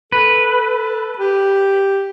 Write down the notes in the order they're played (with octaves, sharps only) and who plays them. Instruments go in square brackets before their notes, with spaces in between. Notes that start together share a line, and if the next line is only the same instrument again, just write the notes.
[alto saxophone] A4 [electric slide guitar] B4
[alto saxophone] G4